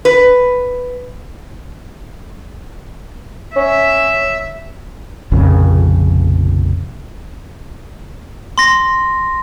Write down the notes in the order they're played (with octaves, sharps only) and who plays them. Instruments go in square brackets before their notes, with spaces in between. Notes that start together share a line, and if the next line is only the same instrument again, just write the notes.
[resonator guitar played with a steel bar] B4
[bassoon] C#4 [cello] E5
[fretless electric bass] F1 A#1 F2 C#3
[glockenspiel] C6 A#6